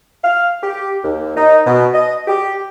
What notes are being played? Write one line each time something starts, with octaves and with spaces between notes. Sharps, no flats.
F5
G4
D#2
D#4
B2
D#5
G4